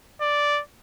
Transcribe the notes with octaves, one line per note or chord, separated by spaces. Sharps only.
D5